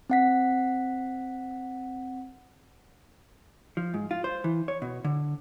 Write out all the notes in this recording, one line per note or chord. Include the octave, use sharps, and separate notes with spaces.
C4 F#5 B6
F3
G#2
F4
C5
E3
C#5
B2
D3